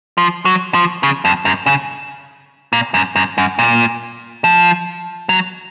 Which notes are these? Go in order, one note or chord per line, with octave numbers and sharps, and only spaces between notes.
F3
F#3
F3
C#3
F2
F#2
C#3
A#2
F#2
F#2
F#2
A#2
F3
F#3